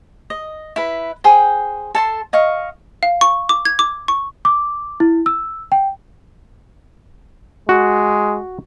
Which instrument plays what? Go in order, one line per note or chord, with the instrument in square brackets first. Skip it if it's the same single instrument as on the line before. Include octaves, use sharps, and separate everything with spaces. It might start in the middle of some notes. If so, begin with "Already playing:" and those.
[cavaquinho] D#5
E4 B4
G#4 C5 G5
A4 A5 C6
D#5 F5 C#6
[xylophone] F5
C#6
D6
G#6
D6
C#6
[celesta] D6
E4
E6
G5
[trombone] G#3 [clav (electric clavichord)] F#4